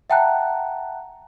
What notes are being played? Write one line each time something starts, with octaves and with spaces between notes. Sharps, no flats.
E5 F#5 G5 A5 A#5 F#6